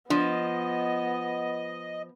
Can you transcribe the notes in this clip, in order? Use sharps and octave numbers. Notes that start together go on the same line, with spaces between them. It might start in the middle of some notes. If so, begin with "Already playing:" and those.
F3 B3 D4 D#5